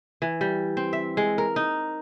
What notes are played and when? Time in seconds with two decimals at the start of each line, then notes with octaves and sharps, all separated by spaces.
0.22 E3
0.41 G3
0.77 C4
0.93 E5
1.17 G#3
1.38 A#4
1.56 D#4